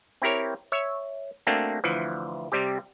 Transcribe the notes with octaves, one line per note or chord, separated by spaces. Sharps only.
C4 E4 G4 A#4 C#5
C#5 E5
A3 A#3 C4 D4 F#4
D2 E3 F3
C3 G3 C4 G4